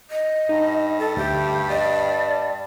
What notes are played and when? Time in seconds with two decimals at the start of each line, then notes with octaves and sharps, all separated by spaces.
0.10 D#5
0.49 G2 D#4
0.99 A4
1.17 D2 G4 E5
1.69 D5 D#5 A5